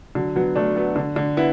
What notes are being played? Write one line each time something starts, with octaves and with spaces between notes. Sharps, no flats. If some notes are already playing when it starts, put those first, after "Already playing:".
D3 F#3
F#3 B3
A3 D4
F#3 B3
D3
D3
B3 E4